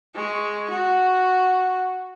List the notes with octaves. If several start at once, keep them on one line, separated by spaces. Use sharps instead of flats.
G#3 C#6
F#4